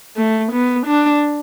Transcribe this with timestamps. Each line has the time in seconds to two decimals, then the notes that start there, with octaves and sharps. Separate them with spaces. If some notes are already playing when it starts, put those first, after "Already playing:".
0.17 A3
0.52 B3
0.87 D4